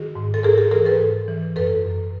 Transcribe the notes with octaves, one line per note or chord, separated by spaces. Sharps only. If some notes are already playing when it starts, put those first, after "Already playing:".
Already playing: D#3 F#4 G#4
G#2
A4
G#2 G#4 A#4
G4 A4
E3 G#4 A#4
A4 B4
G#2
E3
F#2 A4 B4
F#2